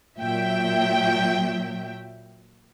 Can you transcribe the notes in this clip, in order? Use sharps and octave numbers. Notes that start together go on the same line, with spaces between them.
A#2 F#3 E5 G5